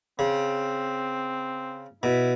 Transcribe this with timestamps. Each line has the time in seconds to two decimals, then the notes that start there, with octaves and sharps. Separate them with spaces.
0.19 C#3 C4
2.03 B2 E4